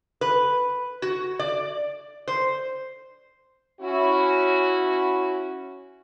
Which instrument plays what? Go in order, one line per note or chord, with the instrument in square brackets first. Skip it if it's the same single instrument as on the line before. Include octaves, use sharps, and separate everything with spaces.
[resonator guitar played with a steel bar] B4
F#4
D5
C5
[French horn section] C#4 E4 F#4